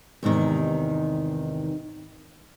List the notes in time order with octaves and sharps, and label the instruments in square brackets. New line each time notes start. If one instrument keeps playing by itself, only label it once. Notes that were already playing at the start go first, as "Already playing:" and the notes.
[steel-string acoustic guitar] E2 G#2 C3 D#3